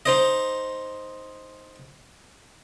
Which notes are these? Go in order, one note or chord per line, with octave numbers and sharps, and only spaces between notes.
D#4 C5 D#5